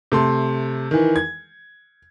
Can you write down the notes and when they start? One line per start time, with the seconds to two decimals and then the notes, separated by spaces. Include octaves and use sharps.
0.12 C3 A3 C6
0.91 D#3 E3
1.16 G#6